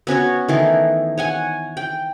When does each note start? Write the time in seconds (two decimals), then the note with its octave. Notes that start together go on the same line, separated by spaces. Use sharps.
0.07 B3 C#4 F#4 C#5
0.48 D#3 E3 A3
1.18 C#5 F#5 G#5
1.77 G5